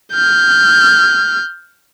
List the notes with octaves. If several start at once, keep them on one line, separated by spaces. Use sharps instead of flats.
F6 G6